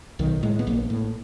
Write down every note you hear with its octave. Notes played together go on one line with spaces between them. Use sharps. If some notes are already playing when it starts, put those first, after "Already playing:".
B1 D#3
A2 G#3
B3
A#1 A#3
A2